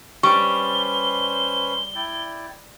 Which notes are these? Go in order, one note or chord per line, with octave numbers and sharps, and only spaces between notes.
G3 C#4 B4 C5 C#6 G7
E4 D5 G5